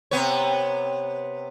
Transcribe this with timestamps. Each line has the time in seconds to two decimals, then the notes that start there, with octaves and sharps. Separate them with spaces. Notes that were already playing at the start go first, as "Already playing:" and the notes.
0.11 C3 B3 C#5